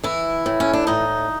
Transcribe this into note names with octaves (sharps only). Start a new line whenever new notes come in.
E3 E4
A2
C#4
D4
A2 D#4